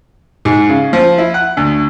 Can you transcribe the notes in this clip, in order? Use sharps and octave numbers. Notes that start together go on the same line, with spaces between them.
G#2
C#3
F3
E4
F#5
D2